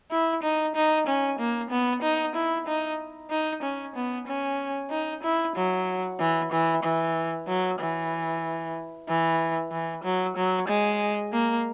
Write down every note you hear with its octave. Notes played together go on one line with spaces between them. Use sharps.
E4
D#4
D#4
C#4
A#3
B3
D#4
E4
D#4
D#4
C#4
B3
C#4
D#4
E4
F#3
E3
E3
E3
F#3
E3
E3
E3
F#3
F#3
G#3
A#3